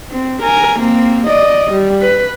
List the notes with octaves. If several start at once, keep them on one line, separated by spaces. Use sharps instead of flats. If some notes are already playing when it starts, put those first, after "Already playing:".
C4
A#4 G#5
A#3 C4
D5 D#5
G3
B4